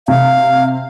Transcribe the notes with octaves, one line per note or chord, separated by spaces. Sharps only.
C3 F5